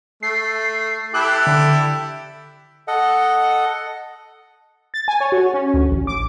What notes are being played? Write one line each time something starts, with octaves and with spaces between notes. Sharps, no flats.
A3 C7
E4 G4 A4 F#6
D3
A4 D#5 F#5
A6
G#5
C#5
F#4
C#4
D2
A1
D6